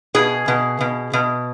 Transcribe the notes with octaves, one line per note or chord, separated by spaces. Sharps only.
B2 G#4
B2
B2
B2